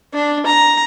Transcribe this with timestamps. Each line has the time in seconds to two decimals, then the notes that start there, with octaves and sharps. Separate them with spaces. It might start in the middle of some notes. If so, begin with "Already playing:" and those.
0.14 D4
0.46 A#5